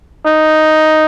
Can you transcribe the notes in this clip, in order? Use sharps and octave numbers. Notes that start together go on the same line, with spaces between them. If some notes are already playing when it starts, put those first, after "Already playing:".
D#4